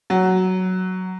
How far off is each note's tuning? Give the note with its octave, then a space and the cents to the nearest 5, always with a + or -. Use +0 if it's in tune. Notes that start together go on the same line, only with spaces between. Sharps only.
F#3 +5